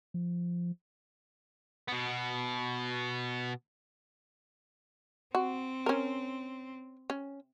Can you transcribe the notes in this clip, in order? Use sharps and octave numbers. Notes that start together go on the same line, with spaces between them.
F3
B2 B3
C4 F#4
C#4 A#4
C#4